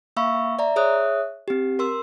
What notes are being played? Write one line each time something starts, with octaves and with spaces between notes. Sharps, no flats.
A#3 E5 F5 B5 C#6 E6
D5 E5 A#5
G#4 C#5 E5 D#6 F#6
C4 G4
A#4 C6 E6